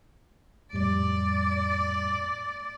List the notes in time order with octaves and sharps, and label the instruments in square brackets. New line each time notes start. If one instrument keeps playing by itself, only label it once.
[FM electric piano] F2 A2 G3 [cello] D5